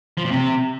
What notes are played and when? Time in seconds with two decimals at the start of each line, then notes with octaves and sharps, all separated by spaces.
0.17 F3
0.24 A#2
0.31 C3